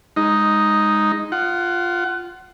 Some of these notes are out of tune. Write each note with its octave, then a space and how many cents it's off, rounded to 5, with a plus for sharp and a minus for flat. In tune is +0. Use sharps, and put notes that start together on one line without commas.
G#3 -10 D#4 +0
F4 +0 F#5 +25